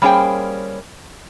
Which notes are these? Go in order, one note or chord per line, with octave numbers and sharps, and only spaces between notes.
G3 A#3 C#4 G#4 C5 G5